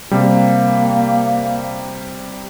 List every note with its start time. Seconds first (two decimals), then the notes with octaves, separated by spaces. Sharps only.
0.11 C3 G3 A#3